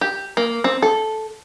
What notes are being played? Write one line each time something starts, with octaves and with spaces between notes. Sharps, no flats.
G4
A#3
C4
A4